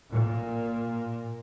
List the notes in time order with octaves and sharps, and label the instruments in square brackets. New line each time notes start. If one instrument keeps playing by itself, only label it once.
[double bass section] A#2